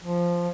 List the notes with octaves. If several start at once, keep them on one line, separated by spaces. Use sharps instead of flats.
F3